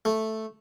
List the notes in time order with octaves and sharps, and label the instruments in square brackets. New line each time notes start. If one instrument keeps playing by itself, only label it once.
[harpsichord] A3